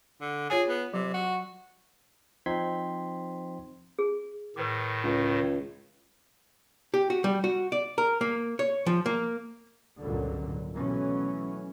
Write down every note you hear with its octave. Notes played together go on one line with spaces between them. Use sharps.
D3
F4 G#4 C#5 G#5
B3
C3 F#3
F#4
F3 C4 D#4 C6 G#6 B6
G#4
A2 D#3 B4 D6
C#2 D#4
G4
F#4
G3
F#4
D5
A#4
A#3
C#5
F3
A#3
G#1 C#2 G2 A#2 D3 F#3
B2 E3 F#3 A3 C#4